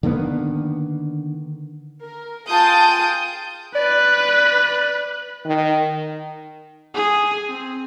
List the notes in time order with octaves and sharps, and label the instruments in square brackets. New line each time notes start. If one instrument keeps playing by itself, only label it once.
[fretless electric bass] D3 D#3 A#3 B3
[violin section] A#4
F4 G#4 G5 A5 D#6 G6
[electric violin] B4 F#6 [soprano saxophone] D5
[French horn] D#3
[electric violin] G#4
C4